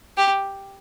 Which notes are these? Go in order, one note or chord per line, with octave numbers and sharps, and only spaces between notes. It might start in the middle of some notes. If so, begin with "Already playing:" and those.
G4